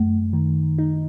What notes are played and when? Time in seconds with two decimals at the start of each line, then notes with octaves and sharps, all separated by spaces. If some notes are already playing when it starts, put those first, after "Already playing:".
Already playing: F#2 A3
0.33 D#3
0.78 D#4